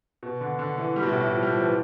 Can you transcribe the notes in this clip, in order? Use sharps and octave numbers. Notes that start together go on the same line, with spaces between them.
B2
D3
D3
E3
G3
B2
A2
A2
F3
G3
F3
E3